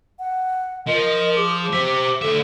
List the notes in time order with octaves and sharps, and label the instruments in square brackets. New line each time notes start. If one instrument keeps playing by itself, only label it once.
[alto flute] F#5
[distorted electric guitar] F3 [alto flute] A#4 [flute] D#5
[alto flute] G#4 [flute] D6
[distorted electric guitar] G4 E5 [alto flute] C5
[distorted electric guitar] D2 E5 [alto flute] A4